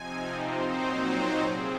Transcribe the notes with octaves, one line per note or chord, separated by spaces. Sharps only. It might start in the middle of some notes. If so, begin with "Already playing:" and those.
Already playing: C3 F3 C4 D#4 G#5
C5
A#2 F#3 C4 D#4
C5
C3 F3 C4 G#4